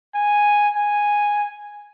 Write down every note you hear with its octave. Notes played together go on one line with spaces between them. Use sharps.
G#5
G#5